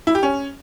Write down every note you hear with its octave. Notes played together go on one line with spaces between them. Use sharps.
E4
G4
C#4